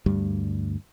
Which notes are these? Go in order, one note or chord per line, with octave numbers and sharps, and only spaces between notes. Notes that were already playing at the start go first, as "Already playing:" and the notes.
D2 G2 G3